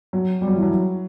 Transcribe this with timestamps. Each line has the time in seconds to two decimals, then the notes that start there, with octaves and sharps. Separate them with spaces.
0.13 F#3
0.41 G3
0.48 F#3
0.55 E3
0.63 F#3